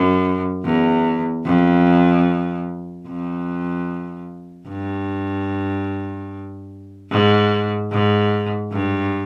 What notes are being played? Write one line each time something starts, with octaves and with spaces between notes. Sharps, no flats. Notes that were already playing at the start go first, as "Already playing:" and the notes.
Already playing: F#2
E2
F2
F2
G2
G#2
G#2
G2